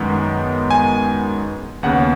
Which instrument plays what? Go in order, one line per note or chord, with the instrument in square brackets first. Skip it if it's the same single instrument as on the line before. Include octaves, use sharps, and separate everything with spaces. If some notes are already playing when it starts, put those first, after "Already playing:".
Already playing: [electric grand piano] F#2 D#3 G#3 B3
G#5
D#2 C#3 B3 F#5